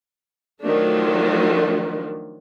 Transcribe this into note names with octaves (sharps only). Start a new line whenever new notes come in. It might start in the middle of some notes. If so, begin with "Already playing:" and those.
D#3 F3 F#3 A3 D4 A#4